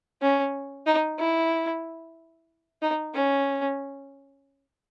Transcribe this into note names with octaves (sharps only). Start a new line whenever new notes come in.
C#4
D#4
E4
D#4
C#4